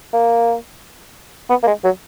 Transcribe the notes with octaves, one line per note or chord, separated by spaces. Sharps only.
A#3
B3
A#3
G#3
F#3